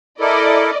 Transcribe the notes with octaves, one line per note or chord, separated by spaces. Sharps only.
E4 A4 A#4 D5 D#5